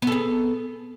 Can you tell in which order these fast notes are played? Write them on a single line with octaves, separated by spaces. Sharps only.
B3 A4 G#4